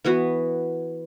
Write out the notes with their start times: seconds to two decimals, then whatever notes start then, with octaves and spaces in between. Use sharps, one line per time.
0.05 E3 B3 F#4 B4